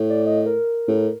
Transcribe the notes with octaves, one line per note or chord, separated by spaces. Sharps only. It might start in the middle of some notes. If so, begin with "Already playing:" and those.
Already playing: A2
D5
D#5
A#4
A2